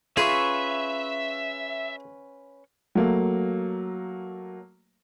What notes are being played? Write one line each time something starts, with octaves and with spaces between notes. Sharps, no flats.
C#4 F4 G#4 B4 E5 C#6
F#3 A3 A#3